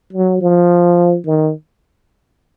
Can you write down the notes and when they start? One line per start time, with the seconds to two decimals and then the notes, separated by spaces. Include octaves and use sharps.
0.13 F#3
0.41 F3
1.26 D#3